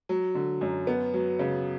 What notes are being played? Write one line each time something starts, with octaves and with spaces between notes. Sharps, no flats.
F#3
D3
F#2
B3
F#3
C#3